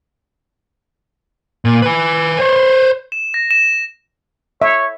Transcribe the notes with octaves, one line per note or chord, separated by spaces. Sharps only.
A#2
B4 G#5
C5 C#5
E7
A#6
E7
C#5 E5